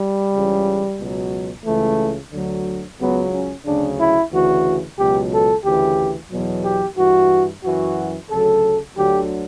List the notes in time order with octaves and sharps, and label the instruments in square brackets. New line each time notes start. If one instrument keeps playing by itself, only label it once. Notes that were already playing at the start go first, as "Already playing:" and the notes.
Already playing: [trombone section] G3
C#2 C#3 E3
C#2 B2 F#3
C#2 C#3 E3 A3
D2 D3 F#3
C#2 C#3 F#3 B3
C#4
D2 C#3 F#3 D4
E4
D2 C#3 E3 F#4
C#2 B2 F#3 G4
A4
D2 C#3 E3 G4
E2 B2 F#3
G4
G2 E3 F#4
F#2 E3 F#4
D2 C#3 F#3 A4
D2 D3 F#3 G4